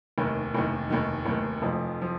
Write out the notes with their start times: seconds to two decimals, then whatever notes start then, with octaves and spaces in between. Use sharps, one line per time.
0.18 F1 D#2 D#3
0.54 F1 D#2 D#3
0.90 F1 D#2 D#3
1.25 F1 D#2 D#3
1.62 F1 F2 F3
2.01 F3